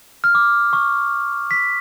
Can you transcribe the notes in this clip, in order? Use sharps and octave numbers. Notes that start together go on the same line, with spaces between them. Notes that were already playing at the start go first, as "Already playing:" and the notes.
F6
D6
C#6
B6